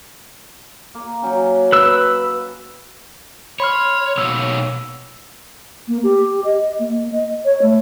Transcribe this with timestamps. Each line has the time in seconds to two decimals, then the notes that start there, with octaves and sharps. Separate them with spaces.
0.95 A#3
1.22 F#3 C#4 G5
1.72 B4 E6
3.60 C#5 B5 C6 F6
4.18 B2 A#3 C#5 E6
5.88 A#3
6.03 G4
6.44 D#5
6.79 A#3
7.12 D#5
7.44 C#5
7.61 A3